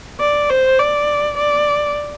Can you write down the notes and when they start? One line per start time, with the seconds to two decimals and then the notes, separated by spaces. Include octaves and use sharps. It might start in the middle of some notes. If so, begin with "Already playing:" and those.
0.20 D5
0.50 C5
0.79 D5
1.37 D5